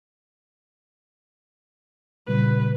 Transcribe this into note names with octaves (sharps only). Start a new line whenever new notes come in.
A#2 C#3 G3 B4